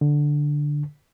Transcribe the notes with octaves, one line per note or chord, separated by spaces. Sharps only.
D3